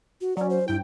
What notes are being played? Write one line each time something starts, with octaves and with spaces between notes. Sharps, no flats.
F#4
F#3 C#4 D5
C5
G2 E4 G5